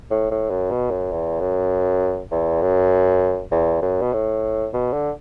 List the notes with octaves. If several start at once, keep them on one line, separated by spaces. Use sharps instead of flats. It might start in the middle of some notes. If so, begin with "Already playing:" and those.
A2
A2
F#2
B2
F#2
E2
F#2
E2
F#2
E2
F#2
B2
A2
B2
D3